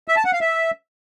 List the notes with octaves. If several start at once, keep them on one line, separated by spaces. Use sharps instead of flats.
E5
A5
F#5
F5
E5